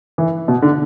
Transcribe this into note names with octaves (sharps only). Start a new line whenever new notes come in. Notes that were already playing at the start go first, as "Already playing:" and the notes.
E3
B2
D3